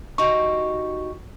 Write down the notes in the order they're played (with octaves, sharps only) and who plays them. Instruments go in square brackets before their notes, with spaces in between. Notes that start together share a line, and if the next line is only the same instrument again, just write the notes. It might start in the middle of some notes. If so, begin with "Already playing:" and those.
[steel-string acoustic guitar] D#4 F#4 G4 [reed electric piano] C#6